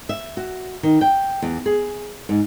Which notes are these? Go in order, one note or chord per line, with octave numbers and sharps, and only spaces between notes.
E5
F#4
D#3
G5
E2
G#4
G#2